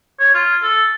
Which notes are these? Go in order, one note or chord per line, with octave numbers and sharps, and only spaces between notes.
C#5
F4
A4